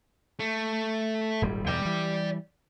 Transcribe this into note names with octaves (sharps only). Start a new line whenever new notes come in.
A3
D#1 G#1 G3
B1 E2 G#2 D5 G5
E3 G3